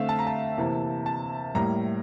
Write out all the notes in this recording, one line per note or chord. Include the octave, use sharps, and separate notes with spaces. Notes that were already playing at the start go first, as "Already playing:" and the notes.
Already playing: D3 A3 C4 E5 F5
A5
A#5
A5
C3 E3 A#3
A5
A2 G3 A#3 A#5